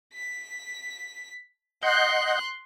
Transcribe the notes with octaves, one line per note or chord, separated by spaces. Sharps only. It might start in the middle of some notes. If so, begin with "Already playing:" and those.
B6
D#5 F#5 C6 F#6 G6